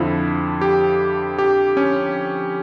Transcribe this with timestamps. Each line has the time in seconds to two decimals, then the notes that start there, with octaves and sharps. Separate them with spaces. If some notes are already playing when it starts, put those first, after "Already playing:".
Already playing: F2 D3 F3 E4
0.61 G4
1.38 G4
1.77 C#4